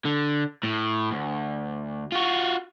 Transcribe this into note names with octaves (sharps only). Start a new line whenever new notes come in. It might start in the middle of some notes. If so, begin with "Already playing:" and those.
D3
A2
D2
F4 F#4